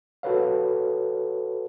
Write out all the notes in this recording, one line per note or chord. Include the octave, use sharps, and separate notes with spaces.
F#4 A4 B4 C#5 F5